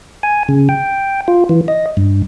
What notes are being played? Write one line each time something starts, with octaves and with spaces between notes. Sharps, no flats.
G#5
C#3
G5
F4
E3
D#5
G2